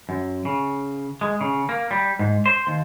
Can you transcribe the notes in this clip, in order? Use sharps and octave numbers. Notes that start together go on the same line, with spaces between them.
F#2
C#3
G#3
C#3
A#3
G3
G#2
C5
D#2